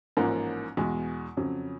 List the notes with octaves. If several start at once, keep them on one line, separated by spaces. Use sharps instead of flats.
A1 G#2 F3 A#3
E2 B2 G#3
F2 C#3 F#3